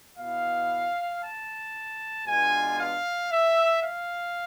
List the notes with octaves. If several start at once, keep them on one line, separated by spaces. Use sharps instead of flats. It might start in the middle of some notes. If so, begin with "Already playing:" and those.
B2 B3 E4 F5
A5
B2 G#3 B3 D4 F4 G#5
F5
E5
F5